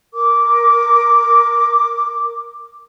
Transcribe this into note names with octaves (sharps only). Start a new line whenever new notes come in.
A#4 D6